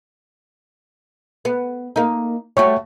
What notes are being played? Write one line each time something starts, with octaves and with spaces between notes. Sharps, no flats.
B3
A#3 D#4
G3 A3 F#4 C#5 C#6